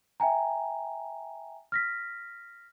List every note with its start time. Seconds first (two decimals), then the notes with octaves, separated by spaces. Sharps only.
0.20 E5 G5 G#5 A#5
1.72 F6 A#6 B6